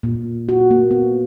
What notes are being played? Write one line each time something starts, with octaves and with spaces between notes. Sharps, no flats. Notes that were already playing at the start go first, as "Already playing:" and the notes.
A#2
F#4
A#3
B3